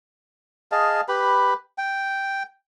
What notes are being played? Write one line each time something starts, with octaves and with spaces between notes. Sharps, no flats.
G#4 D#5 F5 A5
G4 B4 B5
G5